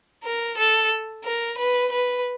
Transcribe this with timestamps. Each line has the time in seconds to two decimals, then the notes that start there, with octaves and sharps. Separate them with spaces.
0.24 A#4
0.58 A4
1.24 A#4
1.58 B4
1.91 B4